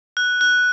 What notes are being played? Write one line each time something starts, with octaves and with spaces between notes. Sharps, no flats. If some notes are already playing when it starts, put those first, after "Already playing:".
F#6
F#6